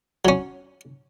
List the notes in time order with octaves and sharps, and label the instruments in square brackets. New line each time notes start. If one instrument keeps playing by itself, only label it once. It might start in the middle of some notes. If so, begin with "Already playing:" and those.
[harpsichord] F#3 C#4